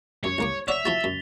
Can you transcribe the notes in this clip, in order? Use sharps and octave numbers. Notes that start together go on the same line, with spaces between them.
F#2 C#5
C2 A#3 D6
C#5 D5 E5 F#5 B6 F7
F3 E4 F#4 A6 G7
F#2